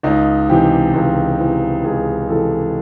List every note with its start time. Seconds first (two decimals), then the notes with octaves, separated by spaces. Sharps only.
0.03 C#2 D#4
0.49 C3 E3 G4
0.94 C#2
1.39 C3 E3
1.84 C#2 G#4
2.28 C3 E3 A4